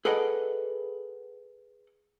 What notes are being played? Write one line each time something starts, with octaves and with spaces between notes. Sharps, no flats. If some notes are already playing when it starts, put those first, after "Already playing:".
G#4 A4 B4 D5 D#5 F#5